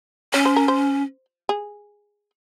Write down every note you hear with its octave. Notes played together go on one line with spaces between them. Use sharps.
C#4 C#5
C5
A#4
C5
G#4